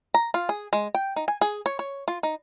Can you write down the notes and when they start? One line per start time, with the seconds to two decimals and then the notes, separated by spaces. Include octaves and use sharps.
0.14 A#5
0.34 F4
0.49 G#4
0.73 G#3
0.95 G5
1.16 D#4
1.28 G#5
1.41 G#4
1.66 C#5
1.79 C#5
2.08 F4
2.23 D#4